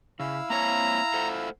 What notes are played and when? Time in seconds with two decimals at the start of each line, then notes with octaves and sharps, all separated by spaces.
0.20 C#3 E4 F5 E6
0.50 A#3 C4 C#5 A#5
1.14 A4 C5 F#5